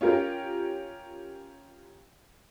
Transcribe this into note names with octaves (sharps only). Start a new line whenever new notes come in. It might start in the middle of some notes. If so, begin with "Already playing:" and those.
C#4 F4 G4 A#4